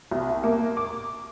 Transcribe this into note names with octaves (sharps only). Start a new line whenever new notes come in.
C2
A#3
D6